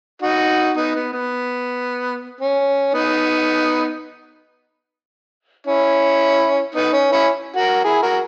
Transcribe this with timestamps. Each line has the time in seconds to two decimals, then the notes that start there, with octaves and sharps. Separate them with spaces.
0.22 D#4 F#4
0.77 B3 D#4
0.95 B3
1.13 B3
2.41 C#4
2.94 B3 D#4
5.67 C#4 E4
6.75 B3 D#4
6.93 C#4
7.12 C#4 E4
7.56 F#4 A#4
7.84 E4 G#4
8.02 F#4 A#4